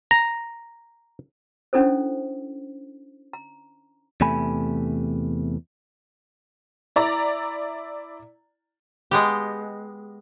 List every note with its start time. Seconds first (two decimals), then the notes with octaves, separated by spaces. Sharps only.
0.11 A#5
1.73 C#4 D4 E4 A4 C5
3.33 A#5
4.21 E2 C3 A3 G#5 B5
6.96 E4 D5 A#5
9.11 G#3 B3 G4